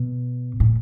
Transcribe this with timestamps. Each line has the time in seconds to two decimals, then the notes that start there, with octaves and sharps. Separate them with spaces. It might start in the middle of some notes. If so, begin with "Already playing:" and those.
Already playing: B2
0.60 A2